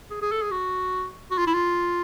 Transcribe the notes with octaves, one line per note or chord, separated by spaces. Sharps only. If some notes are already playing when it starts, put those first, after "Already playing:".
G#4
G#4
A4
G#4
F#4
F#4
F4
E4
F4